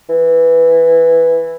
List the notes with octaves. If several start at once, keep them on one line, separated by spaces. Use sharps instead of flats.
E3